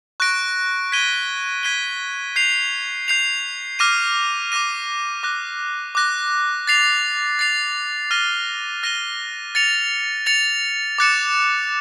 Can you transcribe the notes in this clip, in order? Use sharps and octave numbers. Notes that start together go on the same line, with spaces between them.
C#6 F#6 A#6 D7
G#6 B6 D#7 G7
G#6 B6 D#7 G7
G6 C7 F7
G6 C7 F7
D6 F6 A#6 D#7
D6 F6 A#6 D#7
D6 F#6 A#6
D6 F#6 A#6
A6 C7 F7
A6 C7 F7
F6 A#6 D#7 G7
F6 A#6 D#7 G7
A6 C#7 F7
A6 C#7 F7
D6 F#6 A6 C#7 E7